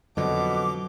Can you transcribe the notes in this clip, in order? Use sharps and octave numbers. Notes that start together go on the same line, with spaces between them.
F2 B2 D3 F#3 D6